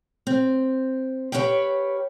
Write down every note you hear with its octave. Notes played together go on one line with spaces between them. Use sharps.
C4
G4 B4 C#5 F5 G5